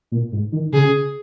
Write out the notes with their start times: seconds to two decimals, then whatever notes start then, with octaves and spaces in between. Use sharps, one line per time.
0.12 A#2
0.32 G#2
0.52 D#3
0.73 C#3 G#4